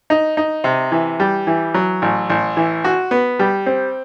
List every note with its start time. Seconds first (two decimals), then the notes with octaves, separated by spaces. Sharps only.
0.10 D#4
0.37 D#4
0.64 C3
0.92 E3
1.20 G3
1.47 E3
1.74 F#3
2.02 A1
2.29 A1
2.57 E3
2.84 F#4
3.11 B3
3.39 G3
3.66 C4